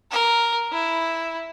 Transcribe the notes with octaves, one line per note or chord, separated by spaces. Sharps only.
A#4
E4